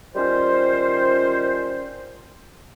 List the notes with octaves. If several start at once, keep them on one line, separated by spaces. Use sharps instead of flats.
D#3 G3 C#4 F4 C5